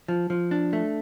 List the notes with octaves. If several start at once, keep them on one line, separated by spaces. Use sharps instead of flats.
F3
F3
D4
A3